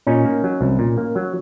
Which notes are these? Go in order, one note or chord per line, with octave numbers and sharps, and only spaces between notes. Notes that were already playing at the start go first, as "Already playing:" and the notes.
A#2 C#4 D#4
A#3
F#3
C2
A#2
A#3
F#3